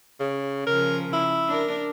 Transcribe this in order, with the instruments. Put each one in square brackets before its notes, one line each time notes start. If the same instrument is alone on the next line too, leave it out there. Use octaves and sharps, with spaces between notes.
[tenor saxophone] C#3
[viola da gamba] C#3 F3 [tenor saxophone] A#4
[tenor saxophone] E4
[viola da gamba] D4 A#4